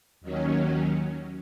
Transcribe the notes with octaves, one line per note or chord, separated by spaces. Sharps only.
D#2 D#3 F#3 C#4